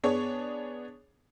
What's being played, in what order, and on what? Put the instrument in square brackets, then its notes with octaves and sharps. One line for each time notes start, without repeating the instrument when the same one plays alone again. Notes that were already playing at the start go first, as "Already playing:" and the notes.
[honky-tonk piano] B3 D4 G#4 C#5